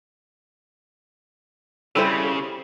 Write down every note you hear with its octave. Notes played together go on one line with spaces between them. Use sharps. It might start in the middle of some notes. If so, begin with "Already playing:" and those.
C#3 G3 E4 A4 C5